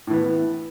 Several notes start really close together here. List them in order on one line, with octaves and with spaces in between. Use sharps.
A2 E3 B3